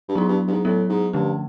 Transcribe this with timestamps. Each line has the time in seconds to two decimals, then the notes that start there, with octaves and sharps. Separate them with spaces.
0.09 G2
0.15 G#2 F#3 B3 E4
0.28 G2
0.47 G2
0.52 G#2
0.65 A2 F#3 B3 E4
0.89 G#2
1.13 G2 D3 F3 A3 C#4